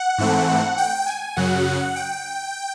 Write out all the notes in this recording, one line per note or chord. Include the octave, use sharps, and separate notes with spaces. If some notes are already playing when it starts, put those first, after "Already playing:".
Already playing: F#5
G#2 E3 A3 C4
G5
G#5
F#2 C#3 F#3 F#5
G5